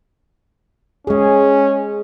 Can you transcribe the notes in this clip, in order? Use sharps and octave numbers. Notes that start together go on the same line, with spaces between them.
G#3 C#4 G#4